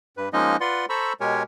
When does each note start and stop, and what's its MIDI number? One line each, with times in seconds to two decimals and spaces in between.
0.17 0.29 43
0.17 0.29 71
0.33 0.57 53
0.33 0.57 56
0.33 0.57 58
0.33 0.57 61
0.33 0.57 63
0.33 0.57 75
0.61 0.86 65
0.61 0.86 71
0.61 0.86 74
0.61 0.86 78
0.61 0.86 84
0.89 1.13 69
0.89 1.13 72
0.89 1.13 82
0.89 1.13 83
0.89 1.13 85
0.89 1.13 88
1.21 1.43 47
1.21 1.43 56
1.21 1.43 67
1.21 1.43 70
1.21 1.43 73
1.21 1.43 80